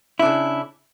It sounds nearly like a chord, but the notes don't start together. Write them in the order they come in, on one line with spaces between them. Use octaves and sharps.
E4 D4 C#3